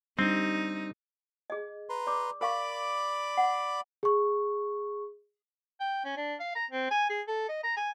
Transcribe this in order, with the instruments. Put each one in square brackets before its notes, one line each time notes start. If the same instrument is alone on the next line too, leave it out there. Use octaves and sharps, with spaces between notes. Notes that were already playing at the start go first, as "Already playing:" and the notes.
[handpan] G3 D4 [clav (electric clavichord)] C4 [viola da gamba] D#4
[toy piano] G#4 D#5
[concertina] B4 A#5 C6
[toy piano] D5 D6
[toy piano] A#4 F5 C#6 [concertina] D5 B5 D6
[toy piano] F#5
[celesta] G#4 C#6
[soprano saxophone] G5
C#4
D4
F5
A#5
C4
G#5
G#4
A4
D#5
A#5
G#5